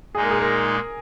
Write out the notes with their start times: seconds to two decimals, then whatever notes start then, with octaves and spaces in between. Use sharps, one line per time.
0.15 A#2 G#3 D#4 G#4
0.23 A#4
0.31 G#4
0.39 A#4